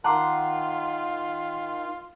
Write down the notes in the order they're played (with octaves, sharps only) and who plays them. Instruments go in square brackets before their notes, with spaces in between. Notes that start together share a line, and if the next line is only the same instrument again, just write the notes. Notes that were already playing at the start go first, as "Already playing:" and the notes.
[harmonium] D#3 [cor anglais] F4 [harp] F#5 C6 [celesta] A5 A#5 D6